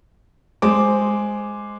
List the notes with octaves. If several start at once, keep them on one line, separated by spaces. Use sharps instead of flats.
G#3 C5 D6